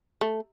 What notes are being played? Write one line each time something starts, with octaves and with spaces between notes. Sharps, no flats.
A3